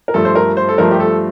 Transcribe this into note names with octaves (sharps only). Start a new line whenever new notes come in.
A#4
G2 F3 A3 A4
C5
A#4
C5
A4
G2 F3 A3 A#4
G4
A4